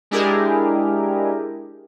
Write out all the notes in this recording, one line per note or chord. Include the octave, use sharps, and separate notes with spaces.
G#3 D4 E4 G4 G#4 A#4